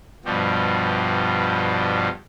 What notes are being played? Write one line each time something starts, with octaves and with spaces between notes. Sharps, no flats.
G2 B2 F3 G3